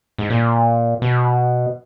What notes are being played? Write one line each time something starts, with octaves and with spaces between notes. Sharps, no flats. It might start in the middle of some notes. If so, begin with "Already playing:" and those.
G#2
A#2
B2